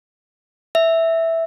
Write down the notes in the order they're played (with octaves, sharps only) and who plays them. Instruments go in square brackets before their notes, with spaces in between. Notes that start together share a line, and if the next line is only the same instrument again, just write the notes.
[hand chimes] E5